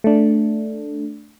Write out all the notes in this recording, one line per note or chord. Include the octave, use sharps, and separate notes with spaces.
A3 D4